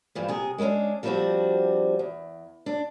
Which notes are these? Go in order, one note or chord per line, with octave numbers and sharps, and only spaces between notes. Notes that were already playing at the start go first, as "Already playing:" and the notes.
G2 E3 F3
C3 G#4
G#3 A#3 B3 C#4 D4
F3 G3 B3 C4 D4 F#4
E2
D4